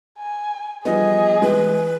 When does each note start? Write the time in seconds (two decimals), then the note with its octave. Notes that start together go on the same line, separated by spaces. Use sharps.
0.19 G#5
0.85 F3 G3 B3 G#4 D#5
1.42 E3 G#3 B4